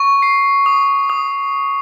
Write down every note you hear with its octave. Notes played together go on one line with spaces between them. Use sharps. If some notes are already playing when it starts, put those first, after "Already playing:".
Already playing: C#6
C7
D#6
D#6